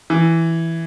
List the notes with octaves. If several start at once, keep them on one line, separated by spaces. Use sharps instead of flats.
E3